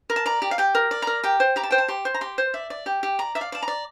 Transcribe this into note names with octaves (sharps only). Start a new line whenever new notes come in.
A#4
A5
D5 A#5
G4
F5
G4 G5
A#4
D5
A#4 A#5
G4 G5
C5
G4 A#5
A5
C5 G5
A5
G4 C6
C5
A#5
G4 C6
C5
D5 E5
D5
G4 G5
G4
D5 A#5
D5 E5
F5
D5 A5
A#5
D5